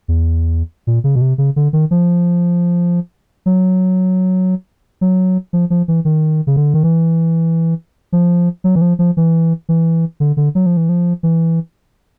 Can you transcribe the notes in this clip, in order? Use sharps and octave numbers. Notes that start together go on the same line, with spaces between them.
E2
A#2
C#3
B2
C3
C#3
D3
D#3
F3
F#3
F#3
F3
F3
E3
D#3
C#3
D3
D#3
E3
F3
F#3
E3
F3
F3
E3
E3
D3
D3
F#3
F3
E3
F3
E3